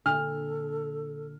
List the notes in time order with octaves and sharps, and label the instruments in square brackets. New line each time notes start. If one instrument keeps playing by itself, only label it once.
[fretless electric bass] A#2 D3 [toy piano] D4 [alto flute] A4 [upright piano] F6